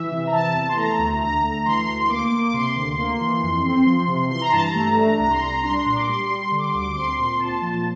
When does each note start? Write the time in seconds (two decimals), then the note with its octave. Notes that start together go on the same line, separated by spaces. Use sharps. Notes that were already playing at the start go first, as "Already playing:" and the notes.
Already playing: E3 E5
0.11 C3
0.27 A#5
0.32 E3 A5
0.55 E2
0.69 C6
0.77 A3 A#5
0.98 D2
1.21 D3 A#5
1.43 A3
1.65 E3 C6
1.88 D2
2.00 C6
2.09 A#3 D6
2.31 A#3
2.44 D6
2.54 C3 C6
2.76 D2
2.98 A#3
3.20 E3
3.43 F2
3.65 C4
3.86 F3
4.08 C3
4.30 E3 C6
4.41 A#5
4.52 G2 A5
4.63 A#5
4.75 A3
4.97 D4
5.19 C2 A#5
5.31 C6
5.42 C2 A#5
5.63 D4 C6
5.86 A#2
5.96 D6
6.07 G3 C6
6.30 G3
6.51 D3
6.59 D6
6.67 C6
6.74 D2 D6
6.95 C4 C6
7.18 A#2
7.40 A#2 A5
7.61 F3